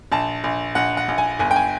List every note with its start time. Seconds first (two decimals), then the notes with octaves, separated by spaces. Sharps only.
0.12 A#1 A5
0.44 A#1
0.75 A#1 F#5
0.97 F#5
1.08 A#1
1.18 G#5
1.39 G1 G#5
1.51 G5
1.56 G#5